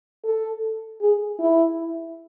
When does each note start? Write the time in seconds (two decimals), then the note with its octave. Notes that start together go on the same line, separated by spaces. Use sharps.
0.24 A4
1.01 G#4
1.40 E4